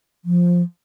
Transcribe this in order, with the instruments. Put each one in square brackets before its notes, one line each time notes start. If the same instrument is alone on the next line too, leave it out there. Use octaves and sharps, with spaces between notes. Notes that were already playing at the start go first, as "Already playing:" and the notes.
[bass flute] F3